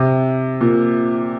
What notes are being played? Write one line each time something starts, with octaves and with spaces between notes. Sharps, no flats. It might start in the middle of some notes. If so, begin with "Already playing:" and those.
Already playing: C3
A#2